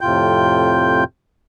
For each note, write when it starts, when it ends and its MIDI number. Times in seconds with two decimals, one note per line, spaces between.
0.01 1.04 41
0.01 1.04 45
0.01 1.04 48
0.01 1.04 65
0.01 1.04 79
0.01 1.04 91